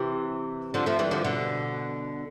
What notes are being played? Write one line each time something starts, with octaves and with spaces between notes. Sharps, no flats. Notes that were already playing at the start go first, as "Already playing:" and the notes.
Already playing: C3 E3
D3 F3
F3 A3
E3 G3
D3 F3
B2 D3